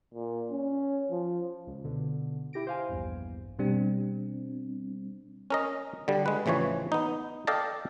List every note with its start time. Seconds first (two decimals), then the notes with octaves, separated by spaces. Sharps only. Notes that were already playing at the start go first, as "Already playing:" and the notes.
0.14 A#2
0.51 C#4
1.11 F3
1.67 C#2
1.84 B2 D3
2.53 E4 G4 A#6 D7
2.67 C5 F5 G#5
2.89 A#1 E2 G2
3.59 B2 G3 C4 D4
5.50 C#4 A#4 D#5
6.08 D3 G3
6.26 G#3 B4
6.46 A1 C#3 E3 F3 C#5
6.92 B3 D#4
7.47 A4 D5 D#5 F5 G5 A5